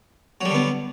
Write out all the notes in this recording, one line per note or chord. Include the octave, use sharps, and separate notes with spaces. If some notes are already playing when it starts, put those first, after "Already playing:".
D3 F#3 G3 B3